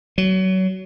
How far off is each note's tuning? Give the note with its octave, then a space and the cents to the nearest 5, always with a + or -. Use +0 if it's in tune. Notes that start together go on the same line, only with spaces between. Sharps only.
F#3 +25